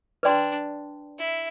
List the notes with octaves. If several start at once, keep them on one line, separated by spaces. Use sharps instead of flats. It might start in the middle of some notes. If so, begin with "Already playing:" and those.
D4 B4 D5 G5 C6
E4